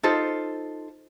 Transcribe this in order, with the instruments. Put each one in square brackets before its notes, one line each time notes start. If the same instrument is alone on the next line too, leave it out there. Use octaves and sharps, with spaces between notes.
[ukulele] D#4 F4 A4 C5